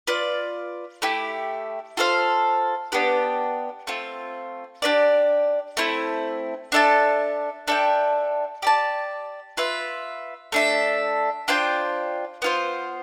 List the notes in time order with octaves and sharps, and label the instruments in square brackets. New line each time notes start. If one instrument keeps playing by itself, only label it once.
[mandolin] F4 B4 D5
A3 E4 G4
F4 A4 C5 F5
B3 D4 G4 B4
A3 C4 F4
D4 G4 B4 D5
A3 C4 E4
D4 A4 E5 A5
D4 A4 E5 G5
G4 D5 A5
F4 B4 E5
A3 D4 A4 E5
D4 F4 C5 G5
B3 F4 C5